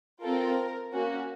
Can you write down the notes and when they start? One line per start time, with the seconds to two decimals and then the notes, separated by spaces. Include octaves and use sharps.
0.22 C4 F4 A4 A#4
0.91 A#3 C#4 F#4